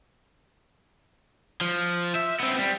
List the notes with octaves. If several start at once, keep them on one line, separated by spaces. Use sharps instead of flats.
F3
E5
B3 C4
G3